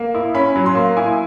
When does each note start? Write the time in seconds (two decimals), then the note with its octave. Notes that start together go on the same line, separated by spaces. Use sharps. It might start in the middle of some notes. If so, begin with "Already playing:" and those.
Already playing: A#3
0.15 E4
0.34 C#4 B5
0.56 F#3
0.66 C6
0.75 A#3
0.97 E4 G#5